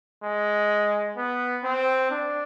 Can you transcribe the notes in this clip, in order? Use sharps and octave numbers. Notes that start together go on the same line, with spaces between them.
G#3
B3
C4
D4